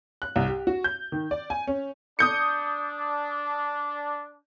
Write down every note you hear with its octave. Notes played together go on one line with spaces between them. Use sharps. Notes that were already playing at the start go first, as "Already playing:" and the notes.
F#6
C2
G4
F#4
G6
D#3
D5
G#5
C#4
D4 D#6 G6 C#7